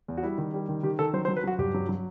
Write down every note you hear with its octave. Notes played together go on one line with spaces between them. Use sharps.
E2
F#4
G3 E4
D#3
G3
D#3
D#3 G4
D#3 A4
F#3 C5
C5
F#3
B4
F#3 F#4
G2 G4
F#3
F#3